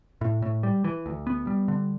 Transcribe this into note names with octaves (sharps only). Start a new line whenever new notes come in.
A2
A2
G3
E3
D2
B3
G3
D3